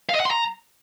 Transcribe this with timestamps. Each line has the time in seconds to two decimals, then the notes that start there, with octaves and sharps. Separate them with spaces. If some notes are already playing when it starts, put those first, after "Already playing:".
0.09 F5
0.15 D#5
0.20 F#5
0.25 C6
0.31 A#5